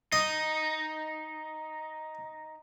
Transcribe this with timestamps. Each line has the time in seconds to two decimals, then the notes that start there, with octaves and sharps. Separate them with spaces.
0.12 D#4 D#5